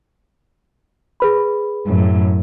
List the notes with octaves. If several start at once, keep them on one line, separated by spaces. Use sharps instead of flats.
G#4 B4 B5
F#2 A2